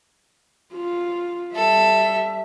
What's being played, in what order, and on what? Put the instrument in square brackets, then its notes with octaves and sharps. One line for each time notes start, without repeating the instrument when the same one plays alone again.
[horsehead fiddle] F4
[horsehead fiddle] G3 E5 [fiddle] A4